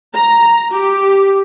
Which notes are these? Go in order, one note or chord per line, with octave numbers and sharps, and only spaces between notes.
A#5
G4